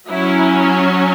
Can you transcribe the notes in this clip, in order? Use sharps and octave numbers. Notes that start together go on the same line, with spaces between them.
F#3 C#4 E4